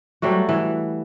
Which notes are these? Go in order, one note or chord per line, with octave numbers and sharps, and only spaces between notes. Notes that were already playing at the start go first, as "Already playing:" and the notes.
F#3 G3 A3 F#4
E3